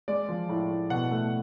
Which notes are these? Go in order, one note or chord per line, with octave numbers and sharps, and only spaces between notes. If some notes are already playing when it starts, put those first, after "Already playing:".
G#3 D5
F3
A2
A2
B2 F#5
A3